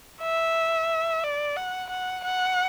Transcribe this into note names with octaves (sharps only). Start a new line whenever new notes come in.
E5
D5
F#5
F#5
F#5